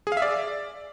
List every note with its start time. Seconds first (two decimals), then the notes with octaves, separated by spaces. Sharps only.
0.07 G#4
0.12 F5
0.17 E5
0.22 D5